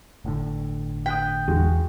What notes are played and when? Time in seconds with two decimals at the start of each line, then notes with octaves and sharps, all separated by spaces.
0.25 G1 A2 D3
1.06 G5 D#6 F#6 B6
1.48 E2 G#2 G#3 F#4